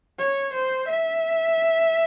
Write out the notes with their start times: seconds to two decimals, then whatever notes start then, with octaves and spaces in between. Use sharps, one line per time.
0.18 C#5
0.53 C5
0.88 E5